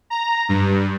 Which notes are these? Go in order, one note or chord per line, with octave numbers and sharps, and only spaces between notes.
A#5
G2